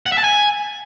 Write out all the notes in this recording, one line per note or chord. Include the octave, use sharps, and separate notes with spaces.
F#5
E5
A5
G#5